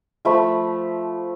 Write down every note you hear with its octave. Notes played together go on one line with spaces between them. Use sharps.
F3 A3 B5